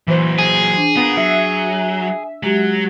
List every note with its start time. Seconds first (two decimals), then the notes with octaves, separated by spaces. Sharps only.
0.07 A#2 E3 F#3 C5
0.39 G#4
0.77 D4
0.96 B3 F4 A#4
1.17 F#3 E5
2.43 F#3 G#3 G4